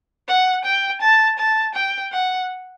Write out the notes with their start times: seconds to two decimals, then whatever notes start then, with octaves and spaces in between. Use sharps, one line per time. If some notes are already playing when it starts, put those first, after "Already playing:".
0.28 F#5
0.65 G5
1.01 A5
1.38 A5
1.75 G5
2.12 F#5